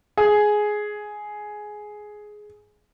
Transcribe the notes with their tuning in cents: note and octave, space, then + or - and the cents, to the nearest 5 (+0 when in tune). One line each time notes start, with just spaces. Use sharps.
G#4 +10